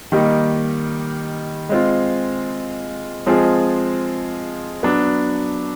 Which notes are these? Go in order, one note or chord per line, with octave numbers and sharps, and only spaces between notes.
D#3 G3 A#3 D#4
G#3 C4 F4
F3 G#3 C4 F4 G#4
F#3 B3 D4